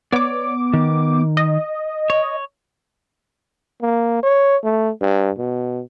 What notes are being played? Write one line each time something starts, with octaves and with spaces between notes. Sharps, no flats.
B3 C#5 D5 D6
D#3
D#5
C#5
A#3
C#5
A3
G2
B2